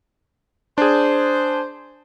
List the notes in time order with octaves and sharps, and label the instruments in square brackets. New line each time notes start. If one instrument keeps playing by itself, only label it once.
[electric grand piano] D4 G#4 [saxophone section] C5